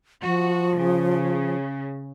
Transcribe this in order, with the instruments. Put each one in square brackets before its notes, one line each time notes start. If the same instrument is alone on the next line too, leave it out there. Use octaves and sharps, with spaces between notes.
[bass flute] F3 [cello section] F#4
[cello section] C#3